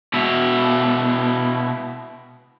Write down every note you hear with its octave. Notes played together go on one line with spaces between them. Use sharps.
B2 E4